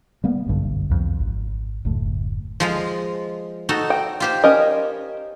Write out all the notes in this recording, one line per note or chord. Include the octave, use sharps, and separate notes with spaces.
G3 A#3 B3
F#1 B1 G2 D3
C2 F2
G#1
F#1 D2 A2
F3 G#3 F4
D#4 F#4 A4
G5
F4 G4 C5
C#4 A#4 D#5